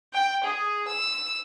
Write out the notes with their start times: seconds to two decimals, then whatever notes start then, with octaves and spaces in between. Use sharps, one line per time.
0.14 G5
0.45 G#4
0.88 E6